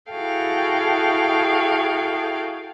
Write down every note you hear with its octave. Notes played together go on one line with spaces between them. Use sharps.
E4 F#4 G#4 A4 F5 G5